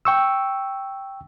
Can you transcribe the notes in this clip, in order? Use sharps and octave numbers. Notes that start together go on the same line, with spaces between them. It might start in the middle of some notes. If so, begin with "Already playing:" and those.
G5 C#6 E6